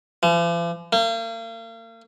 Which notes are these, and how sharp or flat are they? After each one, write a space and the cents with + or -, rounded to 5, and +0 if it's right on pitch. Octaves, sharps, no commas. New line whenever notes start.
F3 -45
A#3 -40